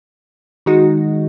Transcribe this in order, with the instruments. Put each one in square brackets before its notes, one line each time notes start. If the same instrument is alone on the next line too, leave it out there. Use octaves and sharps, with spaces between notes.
[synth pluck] D#3 G#3 D#4 F#4